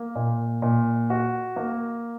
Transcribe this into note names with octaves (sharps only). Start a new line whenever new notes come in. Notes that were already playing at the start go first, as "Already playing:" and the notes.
Already playing: A#3
A#2
A#2
F#4
A#3